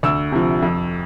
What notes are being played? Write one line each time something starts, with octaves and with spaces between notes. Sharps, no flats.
D2 E6
C3 F3
F2